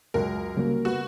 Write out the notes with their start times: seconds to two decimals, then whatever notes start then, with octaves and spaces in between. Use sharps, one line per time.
0.14 C#2 F#2 A#4
0.57 C#3 F#3 G3 A#3
0.85 B3 F#4